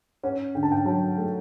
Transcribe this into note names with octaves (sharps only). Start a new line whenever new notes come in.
C#4 F#5
D3 G5
A5
G5
F#3 A5
A3